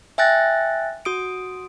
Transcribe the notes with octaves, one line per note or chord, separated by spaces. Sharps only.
E5 G5 G#5 F#6 A6 A#6
F#4 D#6 D7